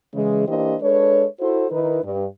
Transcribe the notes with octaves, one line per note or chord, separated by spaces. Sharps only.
C#3 E3 G#3
E3 A#3 D4 G4 C5 D#5
G#3 D4 A4 B4 C#5
E4 F#4 A4 C5
D#3 D#4 E4 A#4 B4
G2